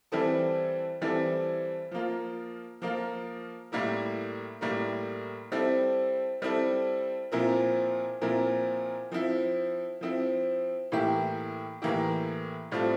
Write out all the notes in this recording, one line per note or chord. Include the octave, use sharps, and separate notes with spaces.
E3 G3 C4 E4 A4
E3 G3 C4 E4 A4
F3 A#3 F4
F3 A#3 F4
A2 G3 A#3 E4 A#4
A2 G3 A#3 E4 A#4
G3 C4 E4 A4
G3 C4 E4 A4
A#2 F3 C4 E4 A#4
A#2 F3 C4 E4 A#4
F3 C4 E4
F3 C4 E4
A2 E3 A#3 E4 G4
A2 E3 A#3 E4 G4
A2 G3 C4 F4 A4